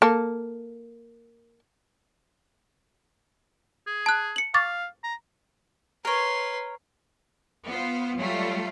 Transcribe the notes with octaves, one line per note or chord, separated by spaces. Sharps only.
A#3 A4
G#4
A5 F#6
C#7 F#7
F5 C#6 D6 A6
A#5
A#4 B4 C#5 C6
B3 F4 C5
F#3 G3 A3 F4